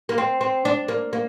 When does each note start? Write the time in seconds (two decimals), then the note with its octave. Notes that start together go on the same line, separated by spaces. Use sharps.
0.09 A#3
0.18 C4
0.41 C4
0.65 D4
0.88 A#3
1.13 A#3